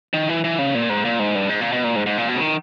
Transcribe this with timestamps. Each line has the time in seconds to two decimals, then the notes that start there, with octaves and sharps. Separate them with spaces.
0.14 D#3
0.29 E3
0.44 E3
0.59 C#3
0.75 A#2
0.90 G#2
1.05 A#2
1.19 G#2
1.35 G2
1.49 G#2
1.61 A#2
1.72 B2
1.84 A#2
1.96 G#2
2.06 G#2
2.17 A#2
2.29 B2
2.36 C#3
2.41 D#3